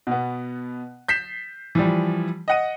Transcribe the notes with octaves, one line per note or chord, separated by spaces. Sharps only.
B2 B3
G6 B6 C7 E7
E3 F3 G3
D#5 F#5 D#7